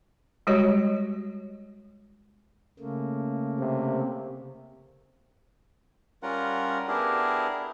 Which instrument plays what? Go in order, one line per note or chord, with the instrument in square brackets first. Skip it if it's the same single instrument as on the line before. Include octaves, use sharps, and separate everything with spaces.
[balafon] G3 G#3 F#4 G4 C#5 D#5
[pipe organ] C#3 A3 A#3
[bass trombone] C3
[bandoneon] G3 C#4 F4 A#4 F#5
B3 D4 E4 G4 G#4 A#4